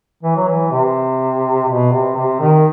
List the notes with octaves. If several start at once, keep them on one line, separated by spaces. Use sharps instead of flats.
E3
F#3
E3
C3
B2
C3
C3
D#3